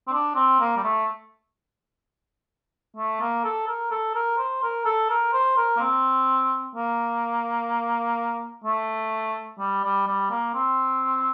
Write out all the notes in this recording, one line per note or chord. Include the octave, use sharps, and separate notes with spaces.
C4
D4
C4
A#3
G3
A3
A3
A#3
A4
A#4
A4
A#4
C5
A#4
A4
A#4
C5
A#4
A#3
C4
A#3
A3
G3
G3
G3
A#3
C4